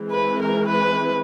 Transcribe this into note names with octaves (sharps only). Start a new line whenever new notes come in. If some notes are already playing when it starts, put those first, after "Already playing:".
Already playing: E3 G#3 C4
B4
A#4
B4